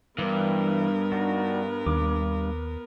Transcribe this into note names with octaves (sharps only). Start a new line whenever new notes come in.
G2 E3 G3 B3 A#4
D4 D#4 F#4
D#2 D6